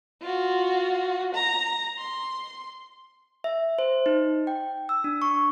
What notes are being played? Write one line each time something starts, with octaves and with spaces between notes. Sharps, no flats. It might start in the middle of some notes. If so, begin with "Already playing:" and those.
F4 F#4
A#5
C6
E5
C5
D#4
G5
E6
D4
C#6